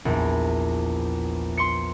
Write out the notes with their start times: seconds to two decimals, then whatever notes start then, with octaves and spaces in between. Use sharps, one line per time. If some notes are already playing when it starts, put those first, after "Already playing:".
0.05 A#1 E2
1.57 C6 C#7